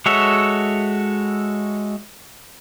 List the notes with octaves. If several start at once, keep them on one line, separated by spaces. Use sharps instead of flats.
G#3 F#4 A4 C#5 E5